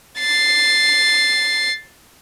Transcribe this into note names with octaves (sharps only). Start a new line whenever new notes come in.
A6 C7